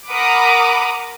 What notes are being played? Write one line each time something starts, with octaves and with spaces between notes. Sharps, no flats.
A#4 F#5 A#5 B5 D6 D#6